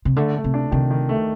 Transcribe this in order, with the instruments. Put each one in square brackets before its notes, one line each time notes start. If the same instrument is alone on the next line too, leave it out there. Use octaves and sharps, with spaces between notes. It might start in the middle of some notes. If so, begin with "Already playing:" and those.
[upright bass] C3
[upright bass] D3 [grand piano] A3
[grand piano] A3
[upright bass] C3
[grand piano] D4
[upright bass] C3 [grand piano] D#3
[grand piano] D#3
A3